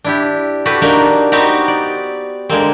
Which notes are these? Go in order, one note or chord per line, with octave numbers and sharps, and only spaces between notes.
D4 E4 G4
F#4 G4 A4 B4
A#3 D4 D#4
B3 C4 D#4 F#4 G4
D5
D3 G#3 A#3 C4